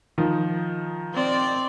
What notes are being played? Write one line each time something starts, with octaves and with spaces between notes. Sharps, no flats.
D#3 F3
C4 D5